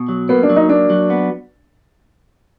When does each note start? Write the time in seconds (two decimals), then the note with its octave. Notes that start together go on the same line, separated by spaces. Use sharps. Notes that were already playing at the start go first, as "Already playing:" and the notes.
Already playing: B2
0.09 F#3
0.29 A#3 B3
0.43 D4
0.49 F#3
0.56 D#4
0.69 A#3 D4
0.90 F#3
1.10 B3